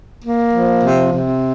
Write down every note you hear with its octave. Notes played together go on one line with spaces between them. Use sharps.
A#3
F3
C3
C3